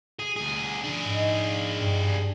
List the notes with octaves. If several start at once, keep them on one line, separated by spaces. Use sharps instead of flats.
G#4
D2 G#4
D4 G#4
G#2
G2